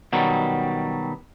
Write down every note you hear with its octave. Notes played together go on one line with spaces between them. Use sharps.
B2 D#3 F#3 G3